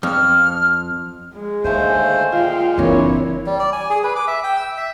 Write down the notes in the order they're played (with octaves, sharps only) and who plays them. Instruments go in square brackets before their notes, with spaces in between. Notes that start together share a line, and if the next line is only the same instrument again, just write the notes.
[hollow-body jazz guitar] F2 [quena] F6
[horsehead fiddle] G#3
[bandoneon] D#2 A3 C5 [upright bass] D3 [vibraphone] D#5 F5 G#5
[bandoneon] A#2 G#3 [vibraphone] F4 [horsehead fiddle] F5 G5
[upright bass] F#1 E3 [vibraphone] C4 D4 A#4 [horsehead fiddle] E4 C#5
[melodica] G3
D5
G#5
G#4
B4
D6
E5
G5
E6
E5